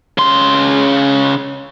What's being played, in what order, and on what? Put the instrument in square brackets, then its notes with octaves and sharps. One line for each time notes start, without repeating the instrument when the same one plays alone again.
[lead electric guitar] C#3 C6